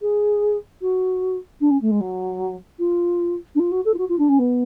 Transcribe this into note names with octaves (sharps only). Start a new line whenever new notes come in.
G#4
F#4
D4
C#4
A3
G#3
F#3
F4
D4
F4
F#4
A4
F4
F#4
F4
D4
C#4
B3